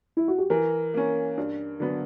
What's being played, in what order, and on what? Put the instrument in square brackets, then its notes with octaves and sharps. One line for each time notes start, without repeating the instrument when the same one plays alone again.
[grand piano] E4
F#4
G4
[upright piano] E3 [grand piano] A#4
[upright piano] A#3 C#4
G2
D3 F#3 B3